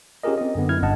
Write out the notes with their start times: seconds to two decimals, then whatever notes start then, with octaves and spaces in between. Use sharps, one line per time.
0.23 C#4 F4 G4 G#4 A#4 D#5
0.38 C4 D#5
0.55 F#2 D3 B3
0.69 F#2 E4 F6 G#6
0.82 G1 G2 D#5 F#5 A5